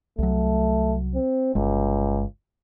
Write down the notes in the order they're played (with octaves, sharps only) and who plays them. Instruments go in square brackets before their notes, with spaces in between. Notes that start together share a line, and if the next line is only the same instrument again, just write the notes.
[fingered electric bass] C2 F#3 [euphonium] A3
[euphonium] C4
[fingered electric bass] G1 G#3 [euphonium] C#2